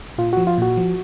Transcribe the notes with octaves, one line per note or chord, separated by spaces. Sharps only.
A#2 F4
F3 F#4
F4
A#2 F#4
F3